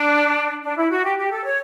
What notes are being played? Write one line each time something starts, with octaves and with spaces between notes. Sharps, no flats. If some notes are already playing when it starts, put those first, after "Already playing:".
Already playing: D4
D4
E4
F#4
G4
G4
A4
C#5